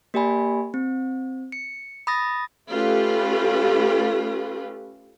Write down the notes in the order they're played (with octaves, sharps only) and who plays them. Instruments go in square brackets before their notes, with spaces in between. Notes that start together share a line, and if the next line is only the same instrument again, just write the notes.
[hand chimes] A#3 G4 D5 G#5 B5
C4
C#7
B5 D#6 A6 A#6
[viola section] A3 C#4 F4 G4 A4 B4